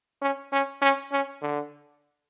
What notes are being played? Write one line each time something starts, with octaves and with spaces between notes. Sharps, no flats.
C#4
C#4
C#4
C#4
D3